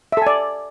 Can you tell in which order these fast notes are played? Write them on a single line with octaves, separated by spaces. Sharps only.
E5 A4 G#5 D5